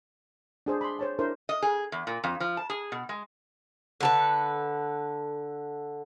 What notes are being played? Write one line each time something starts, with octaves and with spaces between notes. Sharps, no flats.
D4 G#4 C5
B5 C6
C5 C#5 A5
D4 E4 A#4 C5
D#5
G#4
E2
A#2
F2
F3
A5
G#4
B2
G#3
D3 A4 B4